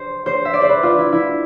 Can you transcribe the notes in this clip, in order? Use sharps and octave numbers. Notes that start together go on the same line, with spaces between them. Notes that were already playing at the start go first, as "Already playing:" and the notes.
Already playing: C5
C5
E5
D5
C5
B4
F4
E4
E4